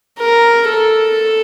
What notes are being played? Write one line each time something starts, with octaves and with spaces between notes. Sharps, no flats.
A#4
A4